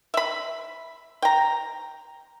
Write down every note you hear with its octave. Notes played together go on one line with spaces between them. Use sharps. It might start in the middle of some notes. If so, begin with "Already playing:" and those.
E5 B5
G5 A#5